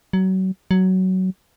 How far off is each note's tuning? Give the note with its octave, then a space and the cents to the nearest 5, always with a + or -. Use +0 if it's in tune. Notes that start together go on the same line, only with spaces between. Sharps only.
F#3 +30
F#3 +15